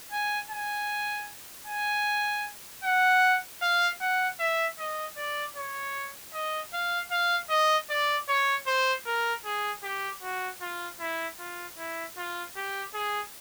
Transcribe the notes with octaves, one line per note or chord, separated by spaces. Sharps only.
G#5
G#5
G#5
F#5
F5
F#5
E5
D#5
D5
C#5
D#5
F5
F5
D#5
D5
C#5
C5
A#4
G#4
G4
F#4
F4
E4
F4
E4
F4
G4
G#4